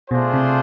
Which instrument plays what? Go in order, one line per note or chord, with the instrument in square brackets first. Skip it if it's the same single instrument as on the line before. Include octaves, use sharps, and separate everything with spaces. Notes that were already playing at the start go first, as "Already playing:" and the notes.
[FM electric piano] B2 [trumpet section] A3 D4 F4 G#4 C5
[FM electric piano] C3